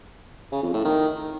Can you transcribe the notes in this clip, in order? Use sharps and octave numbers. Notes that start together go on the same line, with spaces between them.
C#3
F2
A2
D#3